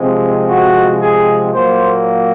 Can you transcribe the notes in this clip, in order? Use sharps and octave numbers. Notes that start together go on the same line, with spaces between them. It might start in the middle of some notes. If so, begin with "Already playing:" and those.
Already playing: C3 F3 G#3 C4
F#4
G#4
A#2 F#3 A#3 C5